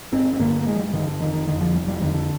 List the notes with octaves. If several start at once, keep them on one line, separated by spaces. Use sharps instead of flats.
G1 C4
C4
G2 D3 A#3
A#3
G1 G#3
F3
G3
G2 D3 D#3
D3
F1 D#3
D#3
F2 D3 D#3
F3
F1 G3
G3
F2 D3 D#3
D3